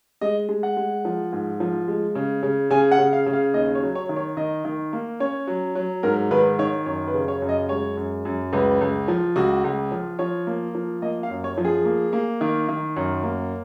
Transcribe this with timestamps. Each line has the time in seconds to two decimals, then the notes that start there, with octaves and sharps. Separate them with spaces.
0.21 G#3 D#5
0.49 G#3
0.63 F#5
0.77 G#3
1.05 F3
1.33 G#2
1.60 F3
1.88 G#3
2.15 C#3
2.43 C#3
2.70 C#3 G#5
2.92 F#5
2.99 C#3
3.13 F5
3.26 C#3
3.33 F5
3.54 D#2 D#5
3.75 C#5
3.82 F#3
3.95 C#5
4.09 D#3
4.16 C#5
4.37 D#3 D#5
4.65 D#3
4.93 A#3
5.20 C#4 C#5
5.47 F#3
5.75 F#3
6.03 G#2 A#4
6.31 D#3 B4
6.59 D#3 C#5
6.86 F#2 C#5
7.07 B4
7.14 C#3
7.28 C#5
7.42 F#2
7.49 D#5
7.69 G#3 C#5
7.97 F#2
8.25 F#2
8.53 C#2 B4
8.81 C#2
9.08 F3
9.36 C#2 F#4
9.64 C#2
9.91 F3
10.19 F3 C#5
10.47 A#3
10.75 F3
11.02 A#3 D#5
11.23 F5
11.30 F#2
11.44 C#5
11.57 F3
11.65 G#4
11.85 A#3
12.13 A#3
12.41 D#3
12.69 D#3
12.96 F#2
13.23 A#3